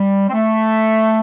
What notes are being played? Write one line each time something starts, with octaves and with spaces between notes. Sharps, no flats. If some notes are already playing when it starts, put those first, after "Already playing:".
Already playing: G3
C4
A3